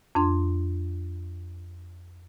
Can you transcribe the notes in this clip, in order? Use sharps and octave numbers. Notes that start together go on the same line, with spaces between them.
F2 D4 C6